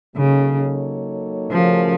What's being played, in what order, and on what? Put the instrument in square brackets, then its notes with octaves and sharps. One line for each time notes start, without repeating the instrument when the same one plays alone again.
[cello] C#3 [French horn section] F#3 A#3 D#4 A4 C#5
[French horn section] C#3 A3 C#4 F#4 A#4 [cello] F3